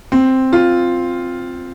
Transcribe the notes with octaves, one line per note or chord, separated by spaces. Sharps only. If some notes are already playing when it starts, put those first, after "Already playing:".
C4
F4